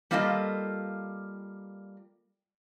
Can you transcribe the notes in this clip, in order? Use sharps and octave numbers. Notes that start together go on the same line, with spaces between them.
G3 A#3 F4 A4 C#5 D#5